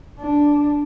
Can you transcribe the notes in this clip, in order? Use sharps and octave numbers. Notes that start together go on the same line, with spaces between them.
D4